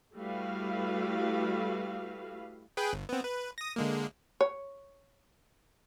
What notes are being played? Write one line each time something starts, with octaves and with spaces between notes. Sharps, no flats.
G3 A3 E4 F#4 B4 F5
G#4 B4 G5
G1
B3 C4
B4
D#6 A#6
D3 G#3 A#3
C#5